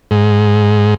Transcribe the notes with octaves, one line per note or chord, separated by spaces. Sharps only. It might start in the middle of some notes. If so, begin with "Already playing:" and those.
G#2